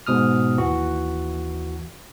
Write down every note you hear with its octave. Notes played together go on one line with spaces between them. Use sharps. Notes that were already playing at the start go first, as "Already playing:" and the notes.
G#2 B2 D#6 F6
D#2 E3 F#4